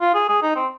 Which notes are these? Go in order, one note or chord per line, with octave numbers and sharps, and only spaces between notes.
F4
G#4
G#4
D#4
C4